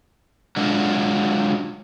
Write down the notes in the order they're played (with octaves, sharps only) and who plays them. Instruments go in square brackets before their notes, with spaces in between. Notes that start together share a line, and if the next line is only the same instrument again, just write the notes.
[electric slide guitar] F#3 G#3 D4 F4